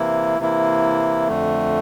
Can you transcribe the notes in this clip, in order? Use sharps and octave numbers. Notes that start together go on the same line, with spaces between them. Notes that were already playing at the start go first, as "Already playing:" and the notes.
Already playing: C3 E3 A#3 E4
C3 E3 A#3 E4
F2 D3 A3